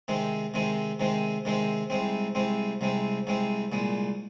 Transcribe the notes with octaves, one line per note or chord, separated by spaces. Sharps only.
C3 D#3 G#3 C4
C3 D#3 G#3 C4
C3 D#3 G#3 C4
C3 D#3 G#3 C4
C2 C3 G#3 C4
C2 C3 G#3 C4
C2 C3 G#3 C4
C2 C3 G#3 C4
C2 A#2 G#3